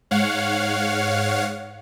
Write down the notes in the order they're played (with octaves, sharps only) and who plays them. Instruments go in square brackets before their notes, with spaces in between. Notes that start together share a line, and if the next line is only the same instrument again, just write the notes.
[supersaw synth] G#2 C#5 F5 F#5